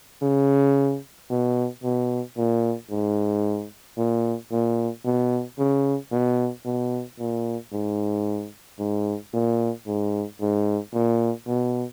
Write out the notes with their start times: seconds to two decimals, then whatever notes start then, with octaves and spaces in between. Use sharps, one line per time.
0.22 C#3
1.30 B2
1.83 B2
2.37 A#2
2.91 G#2
3.98 A#2
4.51 A#2
5.05 B2
5.59 C#3
6.12 B2
6.66 B2
7.19 A#2
7.72 G#2
8.79 G#2
9.33 A#2
9.87 G#2
10.41 G#2
10.94 A#2
11.47 B2